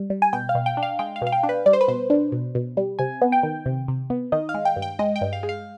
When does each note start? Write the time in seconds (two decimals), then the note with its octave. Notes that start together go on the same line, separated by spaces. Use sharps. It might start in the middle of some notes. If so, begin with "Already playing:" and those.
Already playing: G3
0.10 G3
0.22 G#5
0.33 B2 G5
0.49 F5
0.55 B2
0.66 G5
0.77 D4
0.83 F5
0.99 G#3 G5
1.16 F5
1.22 B2
1.27 F5
1.32 G5
1.43 D4
1.49 B4
1.66 G3 D5
1.73 C5
1.81 B4
1.88 B2 C5
2.10 D4
2.32 B2
2.55 B2
2.77 G3
2.99 C3 G#5
3.22 B3
3.32 G5
3.43 D#3
3.66 C3
3.88 C3
4.10 B3
4.32 D#3 D#5
4.49 F5
4.54 G#3
4.65 G5
4.76 G2
4.82 G5
4.99 G#3 D#5
5.16 G5
5.21 G2
5.33 F5
5.43 G#3
5.49 F5